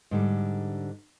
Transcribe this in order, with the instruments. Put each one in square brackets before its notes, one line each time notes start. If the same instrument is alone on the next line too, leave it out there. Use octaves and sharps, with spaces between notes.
[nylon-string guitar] G#2 D3 G3